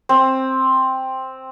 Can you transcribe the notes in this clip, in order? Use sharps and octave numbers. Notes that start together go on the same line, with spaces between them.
C4